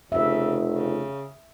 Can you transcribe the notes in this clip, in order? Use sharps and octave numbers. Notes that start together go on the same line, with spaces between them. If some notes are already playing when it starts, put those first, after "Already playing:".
F1 C#3 E5
C#3